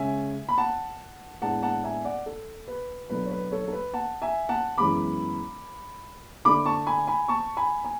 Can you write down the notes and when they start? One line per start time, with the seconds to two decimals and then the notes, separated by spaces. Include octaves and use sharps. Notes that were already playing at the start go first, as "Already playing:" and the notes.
Already playing: C#3 G#3 C#4 E5 G#5
0.49 B5
0.58 F#5 A5
1.42 A2 G#3 B3 D4 F#5 A5
1.63 F#5 A5
1.84 E5 G#5
2.05 D5 F#5
2.26 A4
2.68 B4
3.10 B2 F#3 A3 D4 B4
3.26 C#5
3.31 B4
3.52 A4 C#5
3.68 A4
3.72 B4
3.94 F#5 A5
4.22 E5 G#5
4.49 F#5 A5
4.77 F#2 E3 G#3 B3 B5 D6
6.45 D3 A3 D4 B5 D6
6.66 A5 C#6
6.87 G#5 B5
7.07 G#5 B5
7.28 A5 C#6
7.57 G#5 B5
7.84 G#5